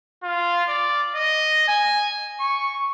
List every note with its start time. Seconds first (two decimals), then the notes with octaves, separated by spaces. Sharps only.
0.23 F4
0.68 D5
1.16 D#5
1.68 G#5
2.40 C#6